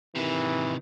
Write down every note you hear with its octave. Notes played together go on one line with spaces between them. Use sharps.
C3 D#3 E3